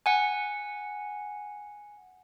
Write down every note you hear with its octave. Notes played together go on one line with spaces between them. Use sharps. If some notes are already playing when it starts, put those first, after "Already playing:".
F#5 G#5